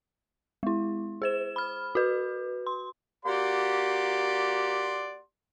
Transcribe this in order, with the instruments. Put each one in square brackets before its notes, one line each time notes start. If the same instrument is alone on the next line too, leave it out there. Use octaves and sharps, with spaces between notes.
[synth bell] G#3 E4
G#4 C5 E7
B5 F6
F#4 B4
C6
[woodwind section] A#3 F#4 G4 [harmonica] D5 F#5 C6